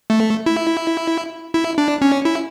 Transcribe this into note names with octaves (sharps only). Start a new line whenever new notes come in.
A3
E4
E4
D4
C#4
E4